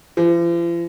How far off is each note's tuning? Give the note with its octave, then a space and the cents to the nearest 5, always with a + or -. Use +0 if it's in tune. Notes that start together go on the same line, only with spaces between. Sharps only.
F3 -45